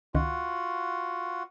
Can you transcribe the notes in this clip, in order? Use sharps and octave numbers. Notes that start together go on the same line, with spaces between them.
C#2 D#3 F4 F#4 F#5